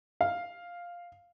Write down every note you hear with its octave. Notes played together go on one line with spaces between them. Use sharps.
F5